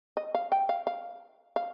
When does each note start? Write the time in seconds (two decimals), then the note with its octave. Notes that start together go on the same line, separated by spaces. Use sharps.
0.17 D#5
0.35 F5
0.52 G5
0.69 F5
0.87 F5
1.56 F5